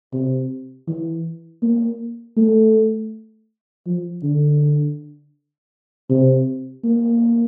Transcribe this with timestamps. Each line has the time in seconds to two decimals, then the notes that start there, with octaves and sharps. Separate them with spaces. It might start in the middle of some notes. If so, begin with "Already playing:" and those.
0.13 C3
0.88 E3
1.63 A#3
2.37 A3
3.86 F3
4.23 D3
6.10 C3
6.84 A#3